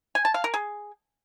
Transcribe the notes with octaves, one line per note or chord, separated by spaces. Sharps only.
G#5
A5
F5
A#4
G#4